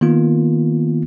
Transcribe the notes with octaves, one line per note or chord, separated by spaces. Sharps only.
D#3 A#3 B3 F4